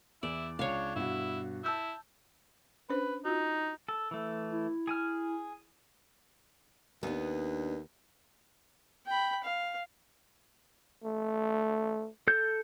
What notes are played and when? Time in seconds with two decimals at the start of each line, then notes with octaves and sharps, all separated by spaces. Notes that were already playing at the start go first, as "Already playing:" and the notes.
0.23 E2 E4 D5
0.59 C#2 D4 C#5 F5
0.96 G2 B2 E4 F#4
1.64 E4 A5 E6 G6
2.90 C#4 D4 B4 C5
3.25 D#4 F4 F#4
3.88 A4
4.11 E3 A3
4.50 E4
4.87 G#4 G#5 F6
7.03 D#2 B3 D4
9.07 G5 B5
9.44 F5
11.04 A3
12.28 A4 G6